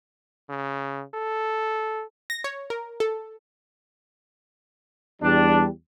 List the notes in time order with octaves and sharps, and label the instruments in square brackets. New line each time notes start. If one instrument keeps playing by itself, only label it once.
[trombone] C#3
A4
[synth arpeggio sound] A#6
C#5
A#4
A4
[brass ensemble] E2 G3 [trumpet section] D4